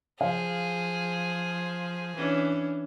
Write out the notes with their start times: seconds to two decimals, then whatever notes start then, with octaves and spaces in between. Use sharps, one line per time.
0.21 F3 G#4 F5
2.16 E3 C#4 D4